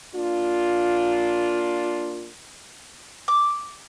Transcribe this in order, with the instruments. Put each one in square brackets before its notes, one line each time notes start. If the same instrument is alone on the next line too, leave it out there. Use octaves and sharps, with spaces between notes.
[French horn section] A#3 D4 F4
[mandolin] D6